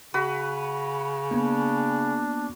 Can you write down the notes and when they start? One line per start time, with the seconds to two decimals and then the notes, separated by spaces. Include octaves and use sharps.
0.14 C#3 F#4 B4
1.31 A#3 B3 D4